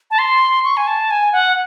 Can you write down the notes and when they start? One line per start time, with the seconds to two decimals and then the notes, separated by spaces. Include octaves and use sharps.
0.11 A5
0.18 C6
0.64 C#6
0.77 G#5
0.87 A5
1.10 G#5
1.32 F#5